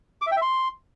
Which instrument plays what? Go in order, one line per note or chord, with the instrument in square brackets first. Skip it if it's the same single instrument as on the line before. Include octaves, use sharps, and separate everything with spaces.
[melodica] D6
E5
G5
E5
C6